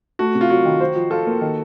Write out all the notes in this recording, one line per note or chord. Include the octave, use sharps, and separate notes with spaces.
A3 F#4
C3
F4
F#3 F#4
D#3
C5
F3
F4 A4
A#3
D#3